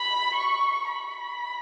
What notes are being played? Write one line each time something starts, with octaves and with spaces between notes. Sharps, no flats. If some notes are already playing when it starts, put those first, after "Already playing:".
Already playing: B5
C#6
B5